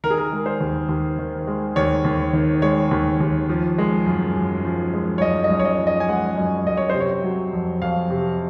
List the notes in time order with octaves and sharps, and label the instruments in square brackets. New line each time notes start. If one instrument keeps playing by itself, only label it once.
[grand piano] D#3 A#4
G#4
A#4
G#3
C5
D#2
D#2
D#3
G#3
D#2 C#5
D#2
D#3
G#3 C#5
D#2
D#2
F3
G#3
F#2
F#2
F3
G#3
C#5
F#2 D#5
D#5
F#2
C#5
D#5
F3
D#5
G#5
G#3 F#5
F#2 D#5
F#2 D#5
C#5
C3 C5
C#5
F#3
F2
F2 F5
C3